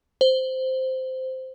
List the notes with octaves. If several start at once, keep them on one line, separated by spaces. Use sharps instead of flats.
C5